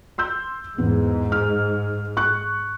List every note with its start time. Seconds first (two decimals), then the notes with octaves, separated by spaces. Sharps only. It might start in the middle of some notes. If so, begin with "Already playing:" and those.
0.18 C6 E6 G6
0.78 E2 G#2 B3
1.32 F6
2.17 C#6 F#6